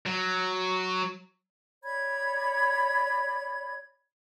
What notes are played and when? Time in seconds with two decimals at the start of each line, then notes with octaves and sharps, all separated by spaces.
0.06 F#3
1.83 C#5 D5 B5 G#6